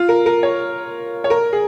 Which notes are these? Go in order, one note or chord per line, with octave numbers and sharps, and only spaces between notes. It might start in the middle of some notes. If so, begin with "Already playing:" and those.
Already playing: F4
A#4
A#4
C#5
C#5
A#4
G#4